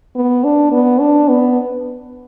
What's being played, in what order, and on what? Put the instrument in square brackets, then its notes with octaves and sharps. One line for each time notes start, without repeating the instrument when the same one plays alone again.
[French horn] B3
D4
B3
D4
B3